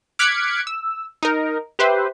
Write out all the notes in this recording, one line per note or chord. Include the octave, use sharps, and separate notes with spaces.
D6 F6 F#6 G#6 B6 C#7
E6
D#4 A#4
G4 B4 C5 E5